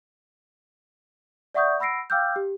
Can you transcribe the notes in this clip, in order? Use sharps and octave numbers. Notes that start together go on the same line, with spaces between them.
D5 E5 F#5 C#6 D#6 G6
F#5 B5 E6 A#6 C7 D7
F5 G5 D6 E6 F6 G6
G4